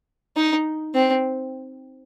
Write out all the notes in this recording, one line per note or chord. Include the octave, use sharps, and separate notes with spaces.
D#4
C4